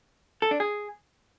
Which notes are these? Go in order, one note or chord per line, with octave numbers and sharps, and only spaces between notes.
A4
D4
G#4